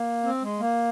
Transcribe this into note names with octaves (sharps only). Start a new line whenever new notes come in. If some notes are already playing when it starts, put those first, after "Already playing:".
Already playing: A#3
C4
G#3
A#3